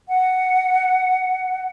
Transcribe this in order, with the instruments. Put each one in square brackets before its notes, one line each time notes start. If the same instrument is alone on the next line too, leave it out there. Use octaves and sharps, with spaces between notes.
[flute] F#5